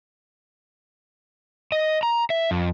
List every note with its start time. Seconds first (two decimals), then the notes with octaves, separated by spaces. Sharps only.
1.72 D#5
2.03 A#5
2.30 E5
2.51 F2